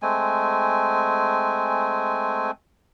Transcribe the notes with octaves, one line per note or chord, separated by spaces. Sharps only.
G#3 A3 C4 G#5